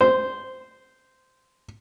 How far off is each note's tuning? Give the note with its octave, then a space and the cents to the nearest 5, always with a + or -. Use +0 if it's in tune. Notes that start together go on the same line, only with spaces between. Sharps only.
C5 -10